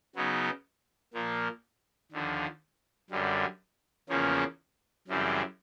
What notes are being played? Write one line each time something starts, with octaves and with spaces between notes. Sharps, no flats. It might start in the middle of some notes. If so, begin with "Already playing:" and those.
C#3 F#3 B3 D#4
A#2 F3 A#3
D#2 D3 F3
F#2 D3 G3
E2 C#3 F3 A#3 C#4
F#2 C#3 E3 G3 C4